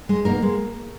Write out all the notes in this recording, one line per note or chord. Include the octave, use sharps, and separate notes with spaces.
G#3
B2 A#3 A#4
G#3